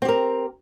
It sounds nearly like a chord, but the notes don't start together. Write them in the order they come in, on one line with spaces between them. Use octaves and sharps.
C4 G4 A#4